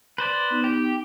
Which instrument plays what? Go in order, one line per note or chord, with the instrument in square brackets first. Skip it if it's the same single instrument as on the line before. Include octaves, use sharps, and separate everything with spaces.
[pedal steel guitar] B4 C5 D5
[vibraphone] B3 D#4
[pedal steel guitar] G4